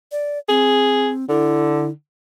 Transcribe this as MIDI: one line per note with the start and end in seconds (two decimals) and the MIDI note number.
0.12 0.38 74
0.49 1.25 60
0.49 1.11 68
1.29 1.90 50
1.29 1.90 64